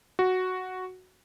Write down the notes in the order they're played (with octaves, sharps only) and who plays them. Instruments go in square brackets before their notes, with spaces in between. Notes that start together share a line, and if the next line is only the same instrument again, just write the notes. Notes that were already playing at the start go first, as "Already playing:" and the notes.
[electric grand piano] F#4